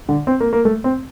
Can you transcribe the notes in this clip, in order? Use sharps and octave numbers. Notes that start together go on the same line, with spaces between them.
D3
C4
A#3
A#3
A3
C4